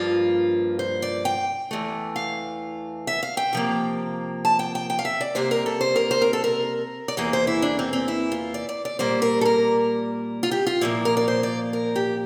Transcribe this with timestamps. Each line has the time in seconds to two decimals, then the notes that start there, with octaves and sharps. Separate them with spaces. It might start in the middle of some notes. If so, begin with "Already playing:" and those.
Already playing: G2 F3 A#3 F4
0.79 C5
1.02 D5
1.25 G5
1.71 E2 E3 A3
2.16 F5
3.07 E5
3.23 F5
3.37 G5
3.53 C3 F3 A#3
4.45 A5
4.59 G5
4.75 G5
4.90 G5
4.99 F5
5.05 E5
5.21 D5
5.35 C3 G3 A#3 C5
5.51 A#4
5.66 A4
5.81 C5
5.96 A#4
6.11 C5
6.22 A#4
6.33 A4
6.44 A#4
7.08 D5
7.17 E2 E3 A#3 C5
7.33 C5
7.47 E4
7.62 D4
7.79 C4
7.93 C4
8.08 E4
8.32 F4
8.54 D5
8.69 D5
8.85 D5
8.99 A#2 G3 A#3 C5
9.22 A#4
9.41 A4
9.45 A#4
10.43 F4
10.51 G4
10.67 F4
10.81 A#2 F3 A#3 E4
11.05 A#4
11.17 D5
11.28 C5
11.43 D5
11.73 A#4
11.96 G4